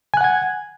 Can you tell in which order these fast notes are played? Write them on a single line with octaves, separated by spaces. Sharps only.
G#5 F#6 F#5 G#6